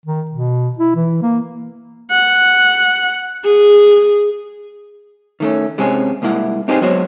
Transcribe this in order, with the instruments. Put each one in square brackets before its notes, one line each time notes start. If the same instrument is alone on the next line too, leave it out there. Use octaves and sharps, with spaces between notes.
[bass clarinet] D#3
B2
E4
E3
A#3
[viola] F#5
G#4
[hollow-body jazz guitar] D#3 A3 C#4
C3 G#3 C4 C#4 G#4
C2 G#3 A#3 E4 F#5
C4 D#4 G4 G#4 B4 C5
F#3 G#3 B3 F#4 C5 C#5